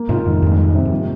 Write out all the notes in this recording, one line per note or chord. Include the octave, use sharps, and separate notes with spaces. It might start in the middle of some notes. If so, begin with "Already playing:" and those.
Already playing: A#3
G#2 C3 F4
F2 G#2 D#3
F2 G#2 G3
A#3
C3
G#2
F3